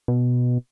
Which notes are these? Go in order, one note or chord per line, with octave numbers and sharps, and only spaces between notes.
B2